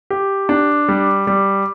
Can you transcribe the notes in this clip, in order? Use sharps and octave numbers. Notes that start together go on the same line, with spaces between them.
G4
D4
G3
G3